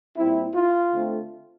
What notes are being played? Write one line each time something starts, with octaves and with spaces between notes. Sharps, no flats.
A#2 G3 C4 E4
F4
D3 A3 C4